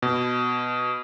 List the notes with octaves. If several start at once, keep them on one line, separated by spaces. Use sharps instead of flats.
B2